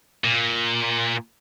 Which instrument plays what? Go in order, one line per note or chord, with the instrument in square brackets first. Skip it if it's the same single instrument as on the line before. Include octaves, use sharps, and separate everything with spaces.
[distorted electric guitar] A#2